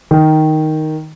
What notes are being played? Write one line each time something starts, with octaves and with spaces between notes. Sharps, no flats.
D#3